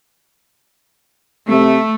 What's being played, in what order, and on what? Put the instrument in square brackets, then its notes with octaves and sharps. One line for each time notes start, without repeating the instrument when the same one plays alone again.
[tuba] C3 [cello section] A3